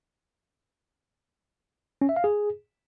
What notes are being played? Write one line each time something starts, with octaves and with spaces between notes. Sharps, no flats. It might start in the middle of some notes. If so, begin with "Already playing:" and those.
C#4
E5
F5
G#4